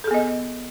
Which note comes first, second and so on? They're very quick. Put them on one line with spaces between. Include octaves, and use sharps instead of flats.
A4 G#4 B3 D#5